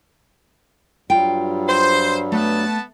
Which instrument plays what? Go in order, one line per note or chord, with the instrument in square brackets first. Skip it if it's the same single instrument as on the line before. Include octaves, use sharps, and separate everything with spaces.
[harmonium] G2 F#3 G3 [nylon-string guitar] F4 G5
[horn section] C5
[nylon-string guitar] A3 [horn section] B3 A5